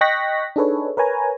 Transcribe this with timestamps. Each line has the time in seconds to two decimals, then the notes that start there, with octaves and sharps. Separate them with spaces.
0.01 D#5 G5 C#6 F#6 A#6 B6
0.56 D4 D#4 G#4 A4 B4 C#5
0.97 A#4 B4 C#5 G#5 A#5